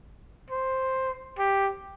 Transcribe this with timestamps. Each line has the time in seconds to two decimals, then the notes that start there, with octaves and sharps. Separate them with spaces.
0.50 C5
1.38 G4